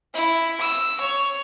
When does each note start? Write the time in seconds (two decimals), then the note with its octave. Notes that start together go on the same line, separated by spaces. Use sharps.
0.14 E4
0.61 E6
1.01 C#5